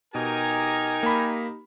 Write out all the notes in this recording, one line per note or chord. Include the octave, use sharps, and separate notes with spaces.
B2 D#4 G4 A#4 G#5
A#3 B5